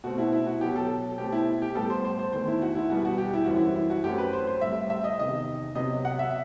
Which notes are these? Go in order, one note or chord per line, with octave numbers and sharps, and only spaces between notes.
B2 A3 C4 F#4
E4
E4
F#4
B2 F#3 B3 G4
A4
B2 A3 C4 G4
E4
G4
A2 G3 B3 A4
C5
C5
C5
E2 D#3 A3 C5
E4
F#4
E4
E2 B2 G3 B3 F#4
F#4
G4
E4
F#2 E3 G3 C4 F#4
E4
E4
F#4
F#2 F#3 A3 C4 G4
B4
C5
C5
A2 G3 C4 E5
E5
D#5
E2 C3 D#3 D#5
C3 F#3 B3 D#5
F#5
E5